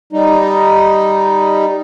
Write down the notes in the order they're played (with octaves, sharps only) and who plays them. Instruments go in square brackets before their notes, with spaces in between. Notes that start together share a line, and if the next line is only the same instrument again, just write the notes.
[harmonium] G3 D#4